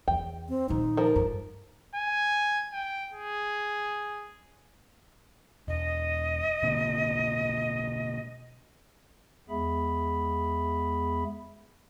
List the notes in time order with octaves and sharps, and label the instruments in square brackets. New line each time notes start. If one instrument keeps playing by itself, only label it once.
[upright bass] E2 [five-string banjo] G5
[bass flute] C4
[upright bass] A#2 D#3 [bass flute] D#4
[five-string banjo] F3 A4 A#4
[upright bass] G2
[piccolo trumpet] G#5
G5
G#4
[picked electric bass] E1 [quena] D#5
[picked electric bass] B2 D3 A#3
[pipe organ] E2 G#3 B3 G#4 E5 B5